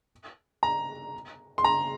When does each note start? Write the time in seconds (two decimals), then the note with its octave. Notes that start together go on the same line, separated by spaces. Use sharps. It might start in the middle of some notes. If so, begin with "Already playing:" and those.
0.63 A#5
1.58 C6
1.64 A#5